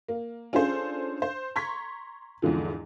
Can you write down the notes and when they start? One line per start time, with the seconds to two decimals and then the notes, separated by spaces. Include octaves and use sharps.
0.08 A#3
0.53 C#4 D4 F4 G#4 A4 C5
1.22 C5
1.56 A#5 C6 C#6 G#6 B6
2.42 E2 G#2 D3 F3